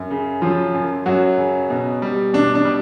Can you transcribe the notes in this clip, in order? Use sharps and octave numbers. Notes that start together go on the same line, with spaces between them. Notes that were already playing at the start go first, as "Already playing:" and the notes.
Already playing: F#2
C#3
F3 F#3 F4
F#2
F#2 F#3 F#4
C#3
B2
G3
B2 D4
D4
G3